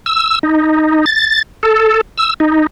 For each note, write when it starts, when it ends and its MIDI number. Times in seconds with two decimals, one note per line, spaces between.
0.06 0.39 88
0.43 1.05 63
1.06 1.42 93
1.63 2.01 69
2.17 2.34 88
2.40 2.67 63